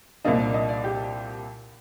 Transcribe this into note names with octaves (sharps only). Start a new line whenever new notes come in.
C2 A#2 F3 A#3 D4 D#5
D5
D#5
D5
G4